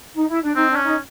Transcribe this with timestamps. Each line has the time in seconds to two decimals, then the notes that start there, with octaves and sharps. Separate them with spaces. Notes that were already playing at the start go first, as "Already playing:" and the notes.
0.15 D#4
0.28 E4
0.42 D4
0.56 C4 D#4
0.69 D4
0.76 C#4
0.84 D#4